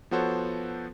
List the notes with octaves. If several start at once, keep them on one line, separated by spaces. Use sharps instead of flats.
F3 B3 F#4 A4 C5 C#5